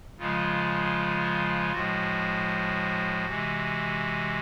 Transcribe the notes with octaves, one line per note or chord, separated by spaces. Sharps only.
C#3 F3 G#3 F4
A2 F3 G#3 F#4
C3 E3 G#3